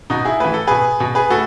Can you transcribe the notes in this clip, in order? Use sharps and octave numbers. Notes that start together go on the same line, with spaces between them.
B2 D#4 F#4
E4 G#4
A2 E3 B4
A4
B2 G#4 B4
B2
G#4 B4
A2 F#4 A4